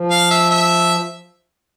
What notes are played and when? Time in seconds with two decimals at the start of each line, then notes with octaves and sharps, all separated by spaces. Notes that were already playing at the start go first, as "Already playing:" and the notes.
Already playing: F3
0.11 F5
0.31 E5
0.50 E5